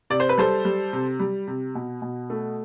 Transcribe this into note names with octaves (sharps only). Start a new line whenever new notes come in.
C3 D5
C5
B4
G3 A4 C5
G3
C3
G3
C3
B2
B2
A3